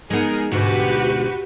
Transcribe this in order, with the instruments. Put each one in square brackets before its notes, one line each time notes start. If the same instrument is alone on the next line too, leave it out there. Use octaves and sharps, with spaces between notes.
[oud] G#3 B3 [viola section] D#4 G#4 A#4
[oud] D2 G#2 B2 [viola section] F#4 G4 B4